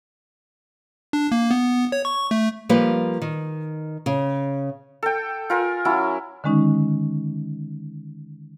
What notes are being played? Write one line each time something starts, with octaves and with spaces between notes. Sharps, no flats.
D4
A#3
B3
C#5
C#6
A3
F3 G3 A#3 B4
D#3
C#3
A4 G5
F4 A#4 G#5
F#3 C#4 E4
D3 D#3 G#3 C#4 D#4